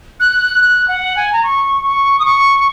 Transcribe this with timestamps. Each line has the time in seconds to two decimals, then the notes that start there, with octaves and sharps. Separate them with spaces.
0.20 F#6
0.61 F#6
0.88 F#5
1.16 G#5
1.32 A#5
1.43 C#6
1.84 C#6
2.19 D#6
2.25 C#6